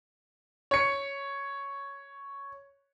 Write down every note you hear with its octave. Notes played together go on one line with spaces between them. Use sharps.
C#5 C#7